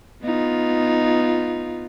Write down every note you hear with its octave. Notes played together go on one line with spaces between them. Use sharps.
B3 D#4 F4